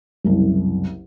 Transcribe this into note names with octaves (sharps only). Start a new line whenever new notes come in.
F#1 C2